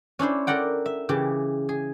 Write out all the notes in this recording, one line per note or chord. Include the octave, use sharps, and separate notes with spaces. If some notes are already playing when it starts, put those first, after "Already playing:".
C#4 D4 E4 C5
A4 A#4 D5 F#5 G5
E5
C#3 E3 G4
G#4